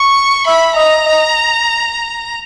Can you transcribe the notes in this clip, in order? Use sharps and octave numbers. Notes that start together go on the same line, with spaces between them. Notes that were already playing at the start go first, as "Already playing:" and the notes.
Already playing: C#6
E5 B5
D#5 A#5
D#5